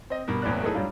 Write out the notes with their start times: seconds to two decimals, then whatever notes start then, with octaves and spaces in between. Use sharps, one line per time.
0.10 C4 D#5
0.28 G2 B2 A#4
0.42 F#1 E2 A2 A#3 D5 F#6
0.63 F#3 A3 D#4 E4 G#4 A4
0.75 G2 F#3 G3 D4 F4